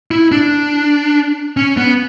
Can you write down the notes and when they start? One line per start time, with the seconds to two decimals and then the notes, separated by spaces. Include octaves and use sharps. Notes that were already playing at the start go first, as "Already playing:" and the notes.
0.11 E4
0.32 D4
1.57 C#4
1.77 B3